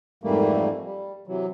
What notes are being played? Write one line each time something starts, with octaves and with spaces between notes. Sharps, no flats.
F2 G#2 E3 G3 A3 A#3
G3
C3 E3 F#3